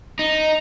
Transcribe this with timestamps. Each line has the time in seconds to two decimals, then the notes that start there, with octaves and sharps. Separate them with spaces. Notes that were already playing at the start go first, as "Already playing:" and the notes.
0.19 D#4